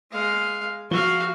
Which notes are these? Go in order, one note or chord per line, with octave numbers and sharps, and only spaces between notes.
G#3 F5
F3 F#4 F5